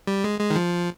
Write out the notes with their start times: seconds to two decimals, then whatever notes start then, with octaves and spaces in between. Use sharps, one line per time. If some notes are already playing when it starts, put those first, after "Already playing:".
0.07 G3
0.24 G#3
0.40 G#3
0.50 D#3
0.56 F3